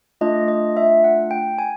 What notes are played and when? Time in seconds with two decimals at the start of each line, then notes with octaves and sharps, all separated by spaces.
0.21 A3 D4 F4 D#5
0.48 D#5
0.77 E5
1.04 F#5
1.31 G5
1.58 G#5